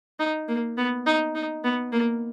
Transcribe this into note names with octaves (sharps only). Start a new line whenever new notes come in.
D#4
A#3
B3
D#4
D#4
B3
A#3